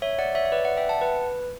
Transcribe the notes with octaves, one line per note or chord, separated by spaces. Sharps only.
C#5 E5
D5 F#5
C#5 E5
E5
B4 D5
D5 F#5
E5 G5
F#5 A5
B4